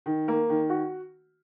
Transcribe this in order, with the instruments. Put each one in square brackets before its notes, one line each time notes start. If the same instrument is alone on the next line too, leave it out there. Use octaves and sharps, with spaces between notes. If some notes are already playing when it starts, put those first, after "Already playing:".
[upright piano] D#3
A#3
D#3
F#4